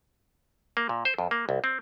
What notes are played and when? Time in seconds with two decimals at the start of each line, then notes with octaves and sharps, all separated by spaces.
0.77 A#3
0.89 A#2
1.05 C5
1.18 F2
1.31 A#3
1.49 C2
1.64 C4